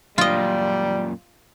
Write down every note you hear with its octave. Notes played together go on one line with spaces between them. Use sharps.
F#2 A#2 G3 F4 D#5